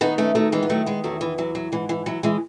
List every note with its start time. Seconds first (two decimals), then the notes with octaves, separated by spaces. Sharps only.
0.01 D#3 B3 D#4
0.18 A3 C#4
0.35 D#3 F#3 A3
0.52 E3 G#3
0.63 B3
0.69 D#3 F#3 A3
0.86 G#3 B3
1.04 E2 F#3 A3
1.21 E3
1.38 E3 F#3
1.55 F#3
1.72 G#2 E3
1.89 E3
2.06 E3 F#3
2.23 E3 G#3